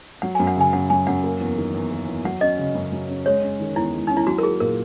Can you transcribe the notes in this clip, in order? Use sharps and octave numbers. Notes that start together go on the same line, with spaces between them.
F#3 F#5
G#5
F#2
F#5
C#3 G#5
F#2 F#5
F#3 G#5
F#2 F#5
A#3
E2
D#3
E2
A#3
E2
F#3 F#5
C#4 D#5
C#3
F#2
F#3
C#4
G#3 C#5
C#4
D#3
E2 E4
G#3
C#4 D#4
E4
F#3 F#4
A#4
A#3 G#4
A#2 A#4